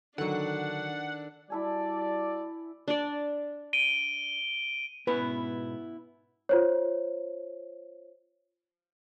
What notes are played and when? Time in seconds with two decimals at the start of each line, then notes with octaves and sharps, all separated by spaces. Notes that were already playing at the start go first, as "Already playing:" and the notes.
0.18 D3 D#3 F#3 D4 A4 F#5
1.50 G3 E4 F#4 A4 D5 G#5
2.88 D4 D5
3.73 D7 D#7 G7
5.07 G#2 B2 B3 C#4 E4 B4
6.49 F4 C5 C#5